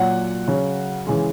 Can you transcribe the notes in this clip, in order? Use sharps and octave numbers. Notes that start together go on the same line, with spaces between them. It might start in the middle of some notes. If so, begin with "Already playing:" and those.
Already playing: A#2 F#3 F#5
C#3 F#3
C#3 E3 G#3